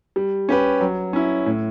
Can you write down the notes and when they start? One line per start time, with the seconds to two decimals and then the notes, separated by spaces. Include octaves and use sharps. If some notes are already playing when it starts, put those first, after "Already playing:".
0.16 G3
0.49 C#4 G4 B4
0.81 F#3
1.13 C#4 E4
1.46 A2